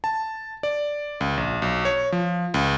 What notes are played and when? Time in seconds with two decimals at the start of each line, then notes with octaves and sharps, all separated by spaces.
0.04 A5
0.63 D5
1.21 C#2
1.37 A#1
1.62 B1
1.85 C#5
2.12 F3
2.54 C#2